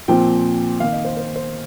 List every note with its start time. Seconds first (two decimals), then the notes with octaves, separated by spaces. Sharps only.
0.08 A#2 F3 C4 G5
0.80 D#3 A#3 F5
0.93 D#5
1.05 C5
1.17 C5
1.36 C5